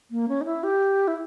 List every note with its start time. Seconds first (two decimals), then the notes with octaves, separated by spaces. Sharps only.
0.11 A#3
0.29 C#4
0.41 D#4
0.45 E4
0.63 G4
1.08 E4